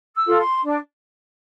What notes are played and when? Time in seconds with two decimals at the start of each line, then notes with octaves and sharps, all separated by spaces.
0.15 E6
0.27 F4 A4
0.38 C6
0.63 D4